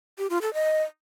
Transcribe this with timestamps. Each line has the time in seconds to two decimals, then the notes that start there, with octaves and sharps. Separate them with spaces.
0.18 G4
0.30 F4
0.42 A4
0.54 D#5